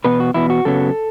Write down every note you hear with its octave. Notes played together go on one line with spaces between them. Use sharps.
E2 B2 B3 B4
F#4
E2 B2 B3 E4
F#4
F#2 C#3 F#3 B3 A4